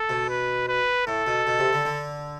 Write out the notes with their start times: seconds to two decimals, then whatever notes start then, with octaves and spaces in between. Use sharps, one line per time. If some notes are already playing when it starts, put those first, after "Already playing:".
Already playing: A4
0.10 B2
0.29 B4
0.68 B4
1.07 A2 A4
1.27 B2
1.47 B2
1.59 C3
1.73 D3
1.85 D3